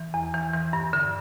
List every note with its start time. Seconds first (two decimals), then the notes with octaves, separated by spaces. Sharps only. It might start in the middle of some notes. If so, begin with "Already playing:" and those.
Already playing: E3
0.14 E2
0.34 E3
0.53 E3
0.73 G2
0.93 D3